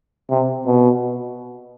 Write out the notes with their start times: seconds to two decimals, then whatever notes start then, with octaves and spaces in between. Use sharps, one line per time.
0.30 C3
0.67 B2